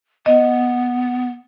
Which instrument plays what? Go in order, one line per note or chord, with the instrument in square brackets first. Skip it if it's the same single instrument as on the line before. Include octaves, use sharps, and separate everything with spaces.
[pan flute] B3 [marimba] D#5